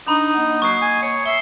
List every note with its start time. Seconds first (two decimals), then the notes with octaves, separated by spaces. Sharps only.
0.07 D4 D#4 A#5 B5
0.34 A#3 D#5 F#5
0.62 F#3 C#6 D#6 C7
0.81 G#5
1.03 C#5 C#7
1.26 E5 C7 G7